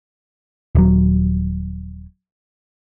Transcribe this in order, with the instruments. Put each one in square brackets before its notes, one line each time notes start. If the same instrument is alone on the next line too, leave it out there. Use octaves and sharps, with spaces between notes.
[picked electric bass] D#1 F#3